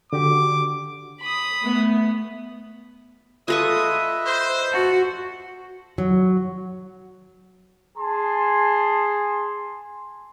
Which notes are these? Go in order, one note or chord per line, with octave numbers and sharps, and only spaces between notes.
D3 F#4 G4 D6
B5 D#6
A3 B3
G#3 F4 A4 B4 D#5 E5 C#6 D#6
C5
F#4 A5
F#3
G#4 G#5 A5 C6